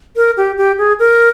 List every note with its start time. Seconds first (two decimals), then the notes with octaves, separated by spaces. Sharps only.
0.16 A#4
0.37 G4
0.57 G4
0.78 G#4
0.99 A#4